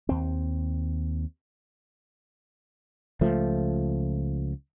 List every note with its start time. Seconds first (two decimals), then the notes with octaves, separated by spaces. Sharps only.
0.09 D#2 C4
3.21 C#2 F3 A3